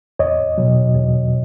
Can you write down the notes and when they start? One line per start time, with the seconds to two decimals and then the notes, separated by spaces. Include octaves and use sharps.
0.19 E2 C#5 D#5
0.58 B2 F#3
0.95 E2